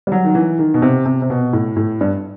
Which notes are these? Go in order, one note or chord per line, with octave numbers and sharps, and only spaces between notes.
G3
F#3
D#3
E3
D#3
B2
C3
C3
C3
B2
A2
A2
G2